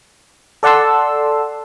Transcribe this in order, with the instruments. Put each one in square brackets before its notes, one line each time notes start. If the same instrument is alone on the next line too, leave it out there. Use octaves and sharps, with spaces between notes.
[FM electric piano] A4 D5 F#5 A5 C6 E6